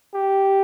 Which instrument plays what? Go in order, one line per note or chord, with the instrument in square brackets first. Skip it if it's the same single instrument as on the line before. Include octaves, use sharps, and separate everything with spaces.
[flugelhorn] G4